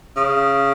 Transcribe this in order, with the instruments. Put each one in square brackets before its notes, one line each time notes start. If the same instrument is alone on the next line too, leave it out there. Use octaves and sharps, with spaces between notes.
[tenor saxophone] C#3